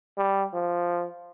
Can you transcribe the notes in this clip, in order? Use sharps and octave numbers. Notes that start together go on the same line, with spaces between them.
G3
F3